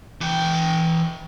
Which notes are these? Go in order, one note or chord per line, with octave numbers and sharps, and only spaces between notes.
E3 G5